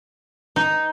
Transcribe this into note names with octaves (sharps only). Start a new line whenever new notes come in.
D#4